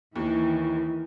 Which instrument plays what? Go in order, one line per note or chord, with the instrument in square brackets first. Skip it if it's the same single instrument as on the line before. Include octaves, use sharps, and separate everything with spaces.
[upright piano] D#2 [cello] D#3 E3 [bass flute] E4